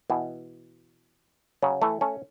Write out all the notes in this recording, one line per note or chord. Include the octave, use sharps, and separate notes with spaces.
B2 E3
C#3 F#3
E3 A3
A3 C#4